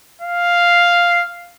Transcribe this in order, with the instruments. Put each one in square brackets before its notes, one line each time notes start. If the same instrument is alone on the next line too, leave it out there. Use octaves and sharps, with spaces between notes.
[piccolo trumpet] F5